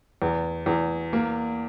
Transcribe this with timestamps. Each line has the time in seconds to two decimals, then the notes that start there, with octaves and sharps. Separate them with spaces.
0.22 E2
0.66 E2
1.13 A#3